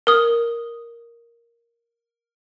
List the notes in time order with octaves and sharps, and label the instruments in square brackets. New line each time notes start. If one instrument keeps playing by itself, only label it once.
[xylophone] A#4 D#6